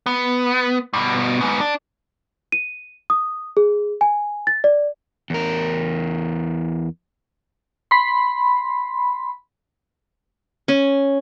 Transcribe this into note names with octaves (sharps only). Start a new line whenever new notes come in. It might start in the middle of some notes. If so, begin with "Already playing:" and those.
B3
G2 B2
G#2 B3
D4
D#7
D#6
G#4
G#5
A6
D5
E2 A#4
B5 C6
C#4